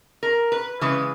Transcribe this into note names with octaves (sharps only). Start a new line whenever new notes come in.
A#4
B4
C#3 E3 G#3 B4